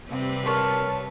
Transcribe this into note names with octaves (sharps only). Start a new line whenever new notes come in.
C3 G3 C4 B4
A#4 C#5 A5 C6